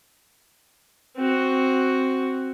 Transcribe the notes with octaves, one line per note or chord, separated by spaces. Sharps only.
C4 F#4